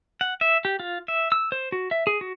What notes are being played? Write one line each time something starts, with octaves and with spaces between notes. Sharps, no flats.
F#5
E5
G4
F4
E5
E6
C5
F#4
E5
G#4
F#4